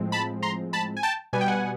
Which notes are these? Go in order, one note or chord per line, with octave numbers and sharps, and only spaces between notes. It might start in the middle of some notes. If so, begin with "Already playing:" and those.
Already playing: A2 F3 G#3 C4
A5 B5
A#5 C6
A5 B5
G#5
G5 A5
B2 G3 B3 G#5
G5
F#5 G#5